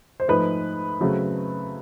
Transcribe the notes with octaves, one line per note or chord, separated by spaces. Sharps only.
C5
G#2 F3 A3 B4
C#3 F#3 A3 C4